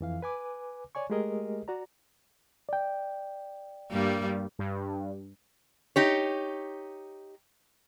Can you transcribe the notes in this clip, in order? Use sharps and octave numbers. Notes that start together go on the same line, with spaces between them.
F2 E3 F5
B4 G#5 D6
C#5 D5 G#5 C#6
G#3 A3 G4 G#4 A#4 D#5
F#4 D5 A#5
D5 G5
G2 G3 A#3
G2
D#4 G4 C#5